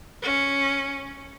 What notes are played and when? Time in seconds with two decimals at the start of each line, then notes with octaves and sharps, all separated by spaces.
0.22 C#4